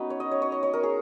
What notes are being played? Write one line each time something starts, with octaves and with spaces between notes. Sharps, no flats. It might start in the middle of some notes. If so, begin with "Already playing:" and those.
Already playing: B3 C#4 D#4 F#4 B4
C#5
D#5
C#5
C#5
D#5
C#5
A#4
G#4